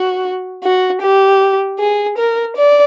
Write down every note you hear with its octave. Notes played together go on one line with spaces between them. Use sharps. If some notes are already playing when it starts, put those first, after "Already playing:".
Already playing: F#4
F#4
G4
G#4
A#4
D5